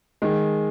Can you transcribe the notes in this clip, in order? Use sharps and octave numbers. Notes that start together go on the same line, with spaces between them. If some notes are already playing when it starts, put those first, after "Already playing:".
D#3 G#3